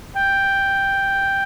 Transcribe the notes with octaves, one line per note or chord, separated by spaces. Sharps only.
G5